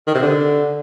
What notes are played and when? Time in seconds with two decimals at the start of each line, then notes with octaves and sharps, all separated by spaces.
0.07 D#3
0.15 C3
0.22 D3